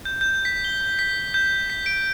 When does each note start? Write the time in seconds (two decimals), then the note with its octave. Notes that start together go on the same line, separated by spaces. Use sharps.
0.05 G6
0.21 G6
0.45 B6
0.64 G7
0.99 B6
1.34 G6
1.70 B6
1.86 D7